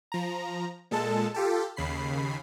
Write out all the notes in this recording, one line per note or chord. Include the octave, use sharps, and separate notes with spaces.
F3 A#5
A#2 G#3 A4 A5
F4 G4 A4
D#2 C#3 B5 C7